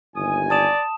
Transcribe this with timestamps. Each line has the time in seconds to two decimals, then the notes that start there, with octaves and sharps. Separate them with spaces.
0.16 G1 D#2 G#5 D#6
0.50 D5 A5 D#6 E7